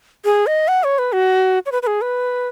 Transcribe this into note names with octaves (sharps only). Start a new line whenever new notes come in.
G#4
D#5
F#5
C#5
B4
F#4
C#5
B4
B4
G#4
B4